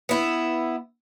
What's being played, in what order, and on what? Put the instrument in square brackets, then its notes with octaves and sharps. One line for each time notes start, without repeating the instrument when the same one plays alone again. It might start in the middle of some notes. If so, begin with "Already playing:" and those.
[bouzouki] B3 E4